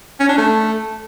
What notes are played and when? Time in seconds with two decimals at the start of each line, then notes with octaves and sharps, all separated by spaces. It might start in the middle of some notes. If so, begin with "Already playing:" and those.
0.20 C#4
0.29 D4
0.38 A3